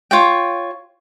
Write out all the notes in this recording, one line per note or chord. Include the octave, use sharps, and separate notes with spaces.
F4 C#5 G5